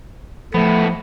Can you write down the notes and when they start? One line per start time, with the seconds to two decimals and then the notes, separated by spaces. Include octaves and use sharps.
0.54 A2 F3 A3 B3